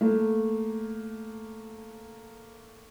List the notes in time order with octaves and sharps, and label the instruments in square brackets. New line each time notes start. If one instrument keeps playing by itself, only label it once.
[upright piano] A3 A#3